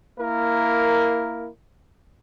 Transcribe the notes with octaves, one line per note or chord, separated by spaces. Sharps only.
A#3 E4 A#4